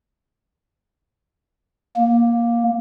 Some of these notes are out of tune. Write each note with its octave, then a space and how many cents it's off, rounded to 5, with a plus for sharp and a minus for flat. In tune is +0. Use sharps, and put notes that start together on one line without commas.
A#3 +10